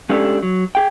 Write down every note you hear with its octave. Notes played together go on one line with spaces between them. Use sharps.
G#3 A3 C#4 D4 G4 A4
F#3
G#4 G5